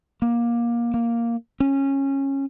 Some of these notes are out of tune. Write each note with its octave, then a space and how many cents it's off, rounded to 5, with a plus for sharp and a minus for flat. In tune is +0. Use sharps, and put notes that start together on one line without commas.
A#3 +20
A#3 +0
C#4 -15